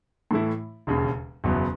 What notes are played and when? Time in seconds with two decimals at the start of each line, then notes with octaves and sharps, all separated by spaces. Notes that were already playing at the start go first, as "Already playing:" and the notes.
0.31 A2 E3 A3 E4
0.87 E1 D#2 C#3
1.44 F#1 E2 B2 F#3 B3